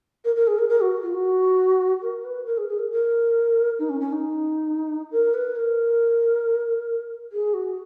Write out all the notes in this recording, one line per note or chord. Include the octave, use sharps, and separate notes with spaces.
A#4
A#4
G#4
A#4
A#4
F#4
F4
F#4
A#4
B4
A#4
G#4
G#4
A#4
A#4
D#4
C#4
C#4
D#4
A#4
B4
A#4
G#4
F#4